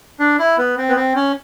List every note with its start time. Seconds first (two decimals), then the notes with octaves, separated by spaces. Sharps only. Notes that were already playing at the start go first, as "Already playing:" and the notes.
0.19 D4
0.39 E4
0.58 B3
0.78 C4
0.89 B3
0.96 C4
1.15 C#4